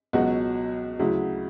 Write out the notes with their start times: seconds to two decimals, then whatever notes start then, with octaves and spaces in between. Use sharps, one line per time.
0.13 C#2 B2 F#3 F#4
0.99 D2 C#3 F#3 E4